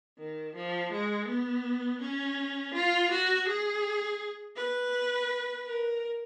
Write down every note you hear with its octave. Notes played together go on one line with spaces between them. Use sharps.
D#3
F3
G#3
B3
C#4
F4
F#4
G#4
B4
A#4